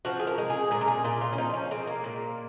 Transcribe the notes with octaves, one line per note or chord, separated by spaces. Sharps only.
F3 F#4
G#4
A#4
G#3
G#4
A#2 G#4
A#4
G#4
A#2 F4
F4
C#4
F3 D#4
D#4
C#4
G#3 C4
A#3
A#2